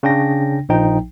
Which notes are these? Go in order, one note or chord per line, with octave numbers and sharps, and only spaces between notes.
C#3 D4 G5 A#6
A#1 F3 D#4 G5